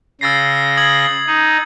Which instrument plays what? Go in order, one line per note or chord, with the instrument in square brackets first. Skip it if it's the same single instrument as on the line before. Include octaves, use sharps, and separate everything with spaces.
[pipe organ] C#3 A#6 [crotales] E6 A6 C7
[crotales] D#6 G#6 F#7
[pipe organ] D#4